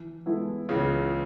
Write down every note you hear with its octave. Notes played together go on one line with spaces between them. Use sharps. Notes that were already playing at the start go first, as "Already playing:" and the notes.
Already playing: E3
G#3 B3 E4 A4
C#2 C#3 E3